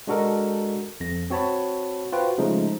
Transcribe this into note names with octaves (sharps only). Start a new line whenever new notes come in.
G#3 D4 F#4 A4 A#4 D#5
F2 A#6
C4 F#4 C#5 A5 B5
F4 F#4 B4 C5 G5
C#3 F3 G#3 A3 D#4